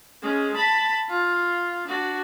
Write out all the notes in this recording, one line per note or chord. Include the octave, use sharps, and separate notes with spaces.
G#3 C#4
A5 B5
F4
D4 F#4